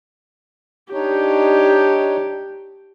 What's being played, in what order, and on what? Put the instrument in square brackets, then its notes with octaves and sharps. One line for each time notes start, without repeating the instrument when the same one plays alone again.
[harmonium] D4 D#4 C#5 [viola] G4